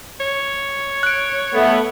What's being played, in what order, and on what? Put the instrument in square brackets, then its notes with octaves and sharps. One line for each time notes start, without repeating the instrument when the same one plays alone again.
[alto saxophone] C#5
[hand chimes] F#6 D7
[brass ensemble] A3 B3